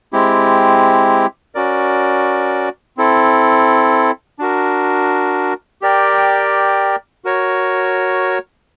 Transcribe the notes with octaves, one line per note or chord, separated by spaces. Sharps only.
G#3 C4 E4 G4
C#4 F#4 A#4 D5
C4 E4 A4
D4 F#4 A#4
G4 A#4 D5 G5
F#4 A#4 C#5